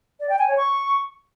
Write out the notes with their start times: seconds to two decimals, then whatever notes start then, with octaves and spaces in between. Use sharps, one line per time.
0.20 D5
0.29 G5
0.39 G#5
0.48 C#5
0.57 C#6